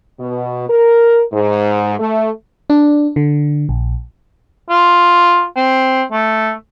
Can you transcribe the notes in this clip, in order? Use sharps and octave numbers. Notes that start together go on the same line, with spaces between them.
B2
A#4
G#2
A3
D4
D3
A#1
F4
C4
A3